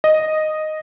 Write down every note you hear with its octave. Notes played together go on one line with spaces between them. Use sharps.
D#5